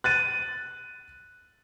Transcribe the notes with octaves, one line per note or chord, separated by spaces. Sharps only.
F#6 A6 D#7